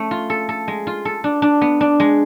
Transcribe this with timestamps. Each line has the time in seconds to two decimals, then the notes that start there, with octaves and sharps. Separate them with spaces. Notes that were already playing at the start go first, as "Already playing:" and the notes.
Already playing: A3 C#4
0.11 F4
0.30 A4
0.49 A4
0.68 G#3
0.87 F4
1.05 A4
1.24 D4
1.42 D4
1.61 B3
1.81 D4
2.00 G#3